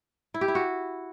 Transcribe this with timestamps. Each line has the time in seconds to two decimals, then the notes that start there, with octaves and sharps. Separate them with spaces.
0.34 E4
0.41 G4
0.48 E4
0.55 F#4